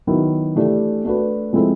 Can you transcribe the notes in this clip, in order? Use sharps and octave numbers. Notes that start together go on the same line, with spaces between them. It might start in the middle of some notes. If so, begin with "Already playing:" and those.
D#3 F#3 B3 E4
E3 A3 D4 G4
A3 D4 F#4 B4
F3 G#3 C4 E4 A4